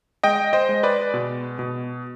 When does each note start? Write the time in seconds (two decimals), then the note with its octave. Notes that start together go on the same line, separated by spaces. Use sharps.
0.23 G#3 D#5 G5
0.53 C5 D#5
0.69 G#3
0.83 B4 D5
1.14 B2
1.59 B2